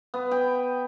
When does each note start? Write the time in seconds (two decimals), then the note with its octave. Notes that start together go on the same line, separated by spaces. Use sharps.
0.14 B3
0.31 G5